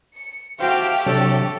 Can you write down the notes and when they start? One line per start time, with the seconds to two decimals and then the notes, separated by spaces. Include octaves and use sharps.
0.16 C#7
0.60 A3 F#4 G4 C5 F5 G5
1.06 C3 F#3 D4 A4